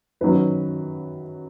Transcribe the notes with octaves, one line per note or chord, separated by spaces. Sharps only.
F#2 D#3 F#3 B4